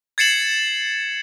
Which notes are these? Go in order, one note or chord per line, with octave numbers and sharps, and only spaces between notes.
G#6 A6 C7 C#7 E7 F#7